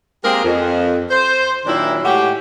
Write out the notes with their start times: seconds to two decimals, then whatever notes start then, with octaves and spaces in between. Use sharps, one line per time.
0.24 G#3 A#3 C4 G4 G#4 A#4
0.44 F2
1.10 C5
1.66 A#2 D#3 F#3 D4 E4
2.04 A2 G#3 F#4 G4